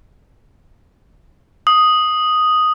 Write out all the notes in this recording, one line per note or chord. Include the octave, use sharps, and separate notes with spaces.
D#6